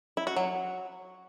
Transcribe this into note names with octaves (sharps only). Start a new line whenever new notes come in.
E4
F#4
F#3